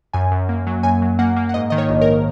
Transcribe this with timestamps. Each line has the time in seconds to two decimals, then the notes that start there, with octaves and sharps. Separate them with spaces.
0.13 F#2 G#5
0.31 F#2
0.49 A#3
0.67 F#3
0.83 F#2 G#5
1.02 F#3
1.19 A#3 F#5
1.36 A#3
1.49 F#5
1.54 G#2 D#5
1.70 D#3 D#5
1.78 C#5
1.89 A#1
2.01 A#4